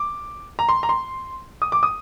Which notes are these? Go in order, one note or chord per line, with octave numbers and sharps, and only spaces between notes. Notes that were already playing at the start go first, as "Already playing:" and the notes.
Already playing: D6
A#5
C6
A#5
C6
D#6
D6
D#6